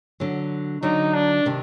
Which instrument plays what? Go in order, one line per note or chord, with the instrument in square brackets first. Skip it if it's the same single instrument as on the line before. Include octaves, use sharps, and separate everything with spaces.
[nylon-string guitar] D3 F#3
[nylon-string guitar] D3 F#3 [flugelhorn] D#4
[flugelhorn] D4
[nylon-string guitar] C3 D#3